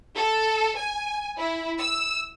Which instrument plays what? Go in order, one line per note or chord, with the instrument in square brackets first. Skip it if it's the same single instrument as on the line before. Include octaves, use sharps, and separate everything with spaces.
[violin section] A4
G#5
E4
E6